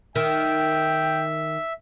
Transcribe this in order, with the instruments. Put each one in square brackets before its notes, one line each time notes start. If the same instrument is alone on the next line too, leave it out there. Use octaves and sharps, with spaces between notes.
[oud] D#3 [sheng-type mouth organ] E5 [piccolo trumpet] G5